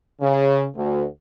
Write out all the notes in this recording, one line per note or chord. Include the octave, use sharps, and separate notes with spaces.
C#3
D2